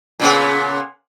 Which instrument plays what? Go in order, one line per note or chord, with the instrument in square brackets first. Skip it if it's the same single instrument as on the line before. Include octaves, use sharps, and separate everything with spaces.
[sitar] A#2 C#3 B3